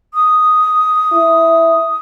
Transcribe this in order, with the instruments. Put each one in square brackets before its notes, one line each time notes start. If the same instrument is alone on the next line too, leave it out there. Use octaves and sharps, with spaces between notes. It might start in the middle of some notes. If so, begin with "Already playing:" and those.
[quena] D#6
[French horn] E4